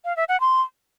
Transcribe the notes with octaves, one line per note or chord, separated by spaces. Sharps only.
F5
E5
F#5
C6